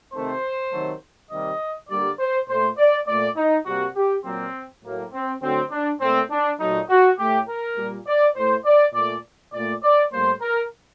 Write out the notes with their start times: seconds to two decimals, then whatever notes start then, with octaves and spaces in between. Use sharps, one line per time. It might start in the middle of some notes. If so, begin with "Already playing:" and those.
0.14 C3 D#3 A3 C5
0.72 C3 D#3 F#3 A3
1.31 C3 D#3 G3 A#3 D#5
1.90 D3 G3 A#3 D5
2.19 C5
2.49 A#2 A3 C5
2.78 D5
3.07 A#2 A3 D5
3.37 D#4
3.66 C3 G3 A#3 F#4
3.96 G4
4.25 A#2 F#3 A#3 C4
4.83 A2 F#3 A#3
5.13 C4
5.42 D3 F#3 A3 C4
5.71 D4
6.01 A#2 A3 C4
6.31 D4
6.60 A#2 F#3 A3 D#4
6.89 F#4
7.19 A2 A3 G4
7.47 A#4
7.77 A#2 G3 A#3
8.07 D5
8.36 A2 A3 C5
8.65 D5
8.94 A#2 A3 D5
9.53 A#2 A3 D5
9.83 D5
10.12 A2 G3 A#3 C5
10.42 A#4